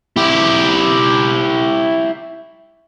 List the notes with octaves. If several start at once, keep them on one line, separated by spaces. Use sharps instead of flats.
E4 G4